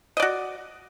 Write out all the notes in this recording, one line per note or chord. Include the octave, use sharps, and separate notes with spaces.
F#4 D5 D#5